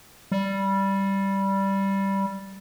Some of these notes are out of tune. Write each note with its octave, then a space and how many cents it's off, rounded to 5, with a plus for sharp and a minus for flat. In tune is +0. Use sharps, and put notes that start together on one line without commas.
G3 -5